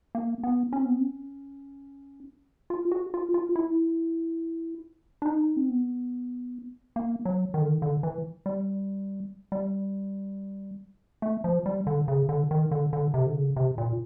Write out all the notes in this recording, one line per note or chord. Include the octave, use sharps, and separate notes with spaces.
A#3
B3
C#4
C4
B3
C4
C#4
F4
F#4
F4
F4
E4
D4
D#4
C4
B3
A#3
F#3
D#3
D3
D#3
D3
E3
G3
G3
A3
F3
G3
D3
C#3
D3
D#3
D3
D3
C3
D3
C#3
C3
A#2